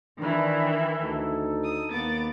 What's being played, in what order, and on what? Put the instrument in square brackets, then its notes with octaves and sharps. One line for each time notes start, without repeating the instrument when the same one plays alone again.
[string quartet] D#3 E3 E4 [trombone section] D4
[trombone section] D2 D#4 A4
[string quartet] D#6
[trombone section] D#2 A#3 [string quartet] B3 D6 A6